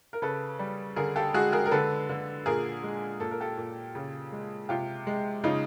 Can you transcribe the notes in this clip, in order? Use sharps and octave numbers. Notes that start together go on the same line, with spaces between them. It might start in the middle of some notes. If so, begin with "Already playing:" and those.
A#4
C#3 A4 B4
G3
D3 G#4 A#4
G4 A4
G#3 F#4 G#4
G#4 A#4
A#4
D3 A4 B4
D3
A#2 G#4 A#4
G#3
A#2 A4
A#4
G4 A4
A#2
C#3
G#3
C3 F4 G4
G#3
C#3 D#4 F4